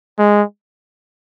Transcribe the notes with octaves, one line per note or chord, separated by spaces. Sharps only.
G#3